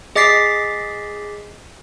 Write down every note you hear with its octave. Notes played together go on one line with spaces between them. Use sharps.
G#4 D#5 D6 A6 B6 C7